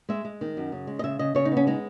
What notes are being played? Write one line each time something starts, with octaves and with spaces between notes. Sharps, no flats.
G#3 E5
G#3
D#3
F#2
C#3
G#3
D#5
C#3 E5
C#3 D#5
C#3 C#5
D#4
B3
C#4
G#3 D#4